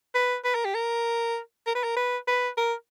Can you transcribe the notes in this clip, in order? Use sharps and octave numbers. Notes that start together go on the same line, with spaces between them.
B4
B4
A#4
G4
A#4
A#4
B4
A#4
B4
B4
A#4